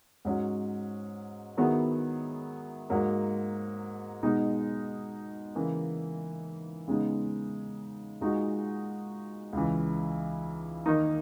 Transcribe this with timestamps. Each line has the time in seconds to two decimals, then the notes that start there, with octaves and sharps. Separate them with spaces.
0.25 G#2 F#3 C#4
1.57 D#3 F#3 B3 E4 G#4
2.90 G#2 F#3 A#3
4.23 B2 G#3 D#4
5.55 C#3 E3 A#3
6.88 C#3 G#3 B3 D#4
8.21 A#2 G#3 D#4 F#4
9.53 C#2 C#3 E3
10.86 D#3 A#3 D#4